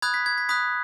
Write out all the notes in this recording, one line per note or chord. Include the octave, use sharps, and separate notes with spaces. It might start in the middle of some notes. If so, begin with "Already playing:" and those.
B5 D#6 F#6 G#6
B6
G#6
B6
B5 D#6 F#6 B6